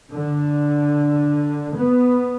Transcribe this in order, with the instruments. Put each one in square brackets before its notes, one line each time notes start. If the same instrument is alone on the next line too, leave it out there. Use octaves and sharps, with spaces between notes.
[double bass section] D3
B3